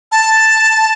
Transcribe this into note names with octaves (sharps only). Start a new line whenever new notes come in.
A5